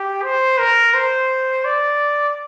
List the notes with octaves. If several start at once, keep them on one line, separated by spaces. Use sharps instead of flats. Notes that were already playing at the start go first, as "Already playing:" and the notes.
Already playing: G4
C5
A#4
C5
D5